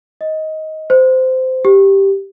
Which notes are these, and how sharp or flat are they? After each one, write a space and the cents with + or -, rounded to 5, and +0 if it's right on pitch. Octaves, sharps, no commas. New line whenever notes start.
D#5 +15
C5 -15
G4 +0